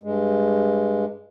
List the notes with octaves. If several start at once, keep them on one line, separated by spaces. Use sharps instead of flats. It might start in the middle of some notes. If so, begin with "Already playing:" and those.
G2 G#3